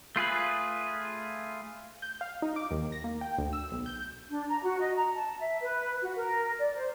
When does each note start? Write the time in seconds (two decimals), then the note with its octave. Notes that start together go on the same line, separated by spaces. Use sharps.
0.16 A3 F4 G#4 B4
2.02 G6
2.21 F5
2.42 D#4
2.56 D6
2.71 D#2
2.92 A#6
3.04 A#3
3.21 G5
3.38 D2
3.53 E6
3.72 B1
3.86 G6
4.29 D4
4.48 A#5
4.63 F#4
4.79 D#5
4.96 A#5
5.15 A5
5.40 E5
5.61 B4
6.02 F#4
6.16 A#4
6.59 D5
6.75 C5